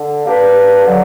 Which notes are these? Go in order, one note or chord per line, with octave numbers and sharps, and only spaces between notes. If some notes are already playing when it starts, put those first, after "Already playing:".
Already playing: D3
A#3 D4 G4 B4
D3 F#3